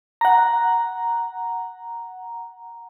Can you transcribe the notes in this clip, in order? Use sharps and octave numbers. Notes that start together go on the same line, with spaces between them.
F#5 A#5